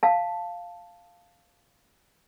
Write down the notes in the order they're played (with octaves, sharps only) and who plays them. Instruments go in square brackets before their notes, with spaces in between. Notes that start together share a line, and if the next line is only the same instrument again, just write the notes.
[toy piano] F5 A5